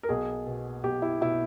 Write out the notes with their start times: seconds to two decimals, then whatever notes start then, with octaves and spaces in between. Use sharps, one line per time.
0.03 A#4
0.09 B1 G#4
0.46 B2
0.84 B1 G4
1.02 E4
1.21 B2 E4